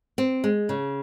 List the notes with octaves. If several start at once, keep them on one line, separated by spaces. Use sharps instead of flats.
C4
G#3
C#3